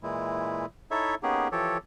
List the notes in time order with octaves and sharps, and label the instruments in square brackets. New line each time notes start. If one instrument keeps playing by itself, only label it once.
[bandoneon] A#2 E3 G#3 E4
D#4 E4 A4 C#5 E5
A#3 B3 C#4 D#4 G4 G#4
E3 F3 G4 A4 C#5